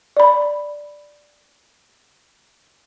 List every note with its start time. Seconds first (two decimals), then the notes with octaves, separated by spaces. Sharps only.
0.17 D5 B5